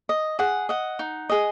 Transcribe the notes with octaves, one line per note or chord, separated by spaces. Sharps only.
D#5
G#4 F#5
D#5 F#5
D#4
G#4 D#5